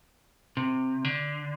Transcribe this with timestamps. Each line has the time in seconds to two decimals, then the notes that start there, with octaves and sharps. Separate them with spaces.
0.57 C3
1.05 D3